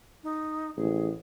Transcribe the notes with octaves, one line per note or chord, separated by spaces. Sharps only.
D#4
A1 G#4